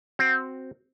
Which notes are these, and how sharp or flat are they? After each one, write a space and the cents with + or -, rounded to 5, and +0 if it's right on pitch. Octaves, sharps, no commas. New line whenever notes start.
C4 +0 F#4 +0